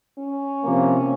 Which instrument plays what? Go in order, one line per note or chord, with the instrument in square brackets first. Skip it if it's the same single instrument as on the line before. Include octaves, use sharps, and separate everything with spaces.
[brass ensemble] C#4
C3 F3 A#3